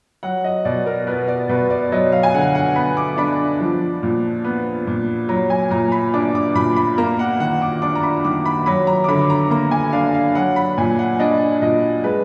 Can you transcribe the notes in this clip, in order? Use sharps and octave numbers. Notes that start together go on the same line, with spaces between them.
F#3 F#5
D#5
B2 D5
A#4
B3 B4
D5
B2 B4
D5
F#3 D#5
F5
G#5
D3 F#5
F#5
B3 B5
D6
D4 B5
F3
A#2
B3
A#2
F#3 A#5
G#5
A#2 A#5
B5
D4 D6
D6
A#2 B5
B5
A#3 A#5
F#5
D#3 F#5
D6
D4 D6
A#5
B5
D#3 D6
B5
F#3 B5
A#5
D6
D3 B5
A#5
A#3 A#5
G#5
D4 F5
F5
F#3 F#5
B5
A#2 G#5
F#5
D4 D#5
A#2 D#5
G#3 B4